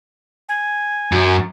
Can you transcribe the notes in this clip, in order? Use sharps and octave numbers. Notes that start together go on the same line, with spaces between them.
G#5
F#2